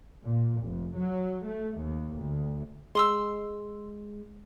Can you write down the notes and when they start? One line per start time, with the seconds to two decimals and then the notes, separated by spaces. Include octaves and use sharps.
0.24 A#2
0.63 F1
0.96 F#3
1.45 A3
1.77 D#2
2.17 D2
2.95 G#3 C6 D#6 E6